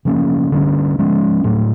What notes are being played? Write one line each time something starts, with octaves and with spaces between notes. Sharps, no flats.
C#3 F3 A#3 C#4
D3 G3 A#3 C#4
F3 G#3 C#4
A2 F#3 A3